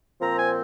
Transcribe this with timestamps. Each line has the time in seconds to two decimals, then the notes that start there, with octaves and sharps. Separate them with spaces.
0.21 A#2 F3 C4 A#5
0.39 G#5